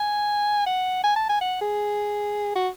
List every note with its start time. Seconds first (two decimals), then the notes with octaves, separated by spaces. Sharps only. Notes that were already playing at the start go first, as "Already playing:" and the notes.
Already playing: G#5
0.66 F#5
1.03 G#5
1.16 A5
1.30 G#5
1.41 F#5
1.61 G#4
2.55 F#4